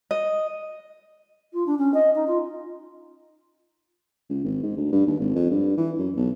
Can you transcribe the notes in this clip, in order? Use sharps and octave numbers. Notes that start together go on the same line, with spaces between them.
D#5
F4
D4
C#4
D#5
D#4
F4
C#2
G#1
G#2
D2
G2
D#2
G#1
F2
G2
E3
F#2
B1